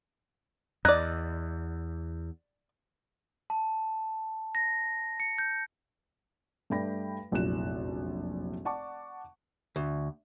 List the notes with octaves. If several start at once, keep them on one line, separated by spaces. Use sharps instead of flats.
E2 D5 D#5 A#5 F#6 G#6
A5
A#6
C#7
G6
G2 A3 D5 G5 B5 A#6
F1 A#1 F#2 E4 F#6 E7
D5 F#5 A5 C#6 D6
D2